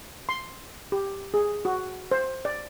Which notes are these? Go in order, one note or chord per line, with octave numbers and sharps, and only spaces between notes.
C6
G4
G#4
F#4
C5
D5